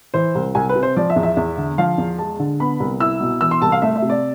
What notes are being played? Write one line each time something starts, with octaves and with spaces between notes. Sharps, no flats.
E3 C5
C2
C2 G#5
B4
C3
C5
F3 D5
E5
E2
E5
E2
D3
F3 F5
E2
G#3 A5
D3
B3 B5
C2
E4 E6
B2
E3 E6
C6
C2 A5
F5
A3 E5
E5
C3
D5